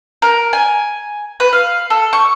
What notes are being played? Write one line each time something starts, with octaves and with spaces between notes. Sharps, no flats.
A#4
G#5
B4
F5
A4
C#6